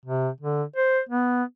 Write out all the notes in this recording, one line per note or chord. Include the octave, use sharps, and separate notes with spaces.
C3
D3
C5
B3